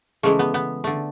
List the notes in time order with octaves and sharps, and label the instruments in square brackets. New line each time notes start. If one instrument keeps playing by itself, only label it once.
[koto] C#3 E3 G#3 A3
B3
B3
D3 A3